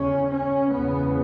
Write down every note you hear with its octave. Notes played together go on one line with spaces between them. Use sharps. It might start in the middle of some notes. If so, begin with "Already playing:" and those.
Already playing: E2 C#3 C#4
C#4
E2 C#3 B3